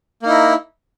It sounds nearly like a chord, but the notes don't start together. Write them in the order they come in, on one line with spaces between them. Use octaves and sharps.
A#3 D#4 E4